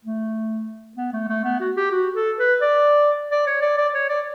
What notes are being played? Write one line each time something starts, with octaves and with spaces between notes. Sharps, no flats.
A3
B3
A3
A3
B3
F#4
G4
F#4
A4
B4
D5
D5
C#5
D5
D5
C#5
D5